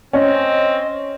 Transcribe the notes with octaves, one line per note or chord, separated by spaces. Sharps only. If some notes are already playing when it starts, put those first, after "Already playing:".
C4 C#4 D#5